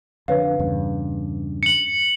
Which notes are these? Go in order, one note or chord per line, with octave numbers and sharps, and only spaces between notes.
F2 D3 B4 C#5 F5
E2 G2 C#3
C#7 F#7